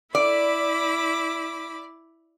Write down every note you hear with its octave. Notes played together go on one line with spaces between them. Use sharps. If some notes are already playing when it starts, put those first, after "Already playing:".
E4 D5 B5 D6